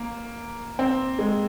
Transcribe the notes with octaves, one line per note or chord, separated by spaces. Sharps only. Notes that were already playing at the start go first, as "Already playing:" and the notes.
Already playing: A#3
C4
G#3